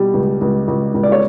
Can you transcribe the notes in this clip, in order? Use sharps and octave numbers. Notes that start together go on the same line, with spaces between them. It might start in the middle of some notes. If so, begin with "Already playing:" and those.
Already playing: B2 G3
C#2
C#2
C#2
C#2
D5
C#5